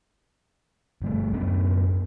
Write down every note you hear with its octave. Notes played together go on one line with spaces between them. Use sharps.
G1 G3 A3
F#2 B3 C#4 D4